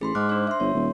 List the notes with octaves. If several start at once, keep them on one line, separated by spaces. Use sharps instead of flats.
A1 G#4 B5 C6
G#2 D6 F6 F#6
D4 C5
E5 C6
G1 C#5
D#1